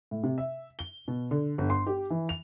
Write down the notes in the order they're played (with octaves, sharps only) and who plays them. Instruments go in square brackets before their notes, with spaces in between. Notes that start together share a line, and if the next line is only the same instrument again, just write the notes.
[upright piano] A2
C3
E5
G7
B2
D3
G1
C6
G4
E3
F7